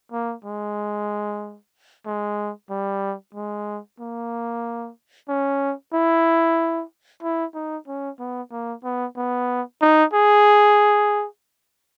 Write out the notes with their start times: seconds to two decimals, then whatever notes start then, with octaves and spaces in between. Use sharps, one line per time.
0.12 A#3
0.44 G#3
2.06 G#3
2.70 G3
3.35 G#3
4.00 A#3
5.29 C#4
5.94 E4
7.23 E4
7.55 D#4
7.87 C#4
8.19 B3
8.51 A#3
8.84 B3
9.17 B3
9.82 D#4
10.13 G#4